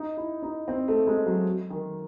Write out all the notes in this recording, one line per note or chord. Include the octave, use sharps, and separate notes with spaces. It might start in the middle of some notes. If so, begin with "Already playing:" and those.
Already playing: D#4
E4
D#4
C4
A3
G#3
F#3
D#3